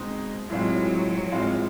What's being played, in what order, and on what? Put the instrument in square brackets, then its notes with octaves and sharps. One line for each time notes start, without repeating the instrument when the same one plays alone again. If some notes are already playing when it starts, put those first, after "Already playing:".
Already playing: [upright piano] B2 G#3 C4 D#4
[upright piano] A2 E3 G#3 C4 F4 [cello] F#3
[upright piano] A2 E3 G#3 C4 F4